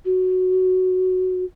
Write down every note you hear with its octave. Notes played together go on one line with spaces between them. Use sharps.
F#4